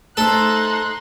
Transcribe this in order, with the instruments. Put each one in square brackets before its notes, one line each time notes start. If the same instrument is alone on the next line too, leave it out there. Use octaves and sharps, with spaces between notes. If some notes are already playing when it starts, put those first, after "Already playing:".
[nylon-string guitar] A3 C5 E5 [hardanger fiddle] D#4 C6 [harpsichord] A4 [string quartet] A#5 F#6